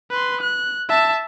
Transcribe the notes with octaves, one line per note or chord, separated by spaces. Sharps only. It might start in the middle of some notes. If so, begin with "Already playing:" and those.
B4 C6
F#6
E5 A5